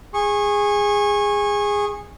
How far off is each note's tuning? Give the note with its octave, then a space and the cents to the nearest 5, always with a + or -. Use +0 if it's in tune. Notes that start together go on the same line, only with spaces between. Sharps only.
G#4 -15 C#6 -25